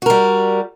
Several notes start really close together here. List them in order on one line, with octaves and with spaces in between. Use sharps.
F#4 A#4 G3